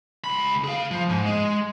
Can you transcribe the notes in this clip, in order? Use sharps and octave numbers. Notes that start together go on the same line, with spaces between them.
C#2 B5
G#4 F5
F3
G#2
G#3